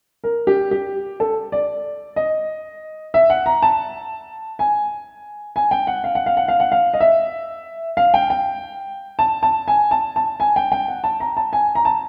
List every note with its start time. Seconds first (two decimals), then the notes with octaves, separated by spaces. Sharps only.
0.24 A#4
0.47 G4
0.71 G4
1.20 A4
1.52 D5
2.16 D#5
3.14 E5
3.30 F#5
3.46 A#5
3.62 A5
4.59 G#5
5.56 G#5
5.71 G5
5.87 F#5
6.04 F5
6.15 F#5
6.26 F5
6.37 F#5
6.48 F5
6.60 F#5
6.72 F5
6.94 D#5
7.00 E5
7.97 F5
8.14 G5
8.30 G5
9.19 A5
9.43 A5
9.68 G#5
9.91 A5
10.16 A5
10.40 G#5
10.56 G5
10.72 G5
10.88 F#5
11.04 A5
11.20 A#5
11.37 A5
11.53 G#5
11.75 A#5
11.85 A5